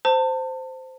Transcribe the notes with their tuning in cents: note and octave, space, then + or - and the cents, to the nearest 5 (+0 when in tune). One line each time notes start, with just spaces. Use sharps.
C5 -10 A5 +30